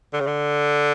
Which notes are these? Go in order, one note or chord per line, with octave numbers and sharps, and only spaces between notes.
D3
C#3
D3